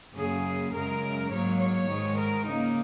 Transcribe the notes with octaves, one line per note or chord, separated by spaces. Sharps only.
F#2 C#3 A#3 G#4
F#2 C#3 G#3 A#4
G#2 F#3 A#3 C#5
C#5
G#2 D#3 G#3
A#4
C#3 A#3 D#4